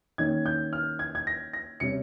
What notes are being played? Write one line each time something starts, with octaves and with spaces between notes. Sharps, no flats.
D#3 A#3 C#4 G#6
G6
F6
G#6
G#6
A#6
A#6
C3 G3 C#4 C#7